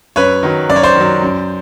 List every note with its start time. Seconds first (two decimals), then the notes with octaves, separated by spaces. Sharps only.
0.16 F#2 B4 C#5
0.43 D#3 F#3
0.69 F#2 D5
0.76 C#5
0.83 C5 D5
0.95 D#3 F#3
1.22 F#2